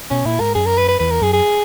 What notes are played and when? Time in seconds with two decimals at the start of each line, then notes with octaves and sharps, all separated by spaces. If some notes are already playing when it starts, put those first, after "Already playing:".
0.11 B2 C#4
0.25 A#2 E4
0.40 G#2 A#4
0.55 F#2 G#4
0.66 A#4
0.78 B4
0.88 B4
0.99 E2 B4
1.11 A#4
1.21 F#2 G#4
1.33 G#4